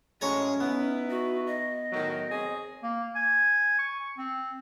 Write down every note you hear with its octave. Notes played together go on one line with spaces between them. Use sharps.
A2 F#3 G#3 C#4 C#5 G#5 A#5
B3 D#4 E4 B4
F#4
D#5
A2 D#3 F#3
C4 G#4 C#5
A#3
G#5
C#6
C4